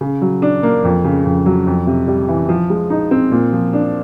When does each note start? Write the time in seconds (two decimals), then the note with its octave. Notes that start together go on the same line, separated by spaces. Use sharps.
0.01 C#3
0.21 F#3
0.42 D4
0.63 A#3
0.84 F2
1.04 C#3
1.25 F2
1.46 F#3
1.67 F2
1.87 C3
2.08 G3
2.28 E3
2.49 F3
2.70 G#3
2.90 D#4
3.11 C4
3.32 A#2
3.53 F3
3.73 D4